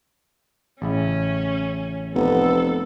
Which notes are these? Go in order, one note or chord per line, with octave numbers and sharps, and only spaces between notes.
A1 C#3 C#4 E4
F1 B3 A4